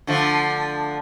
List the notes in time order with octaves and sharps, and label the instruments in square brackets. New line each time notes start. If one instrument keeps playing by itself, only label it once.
[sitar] D3 F3 A3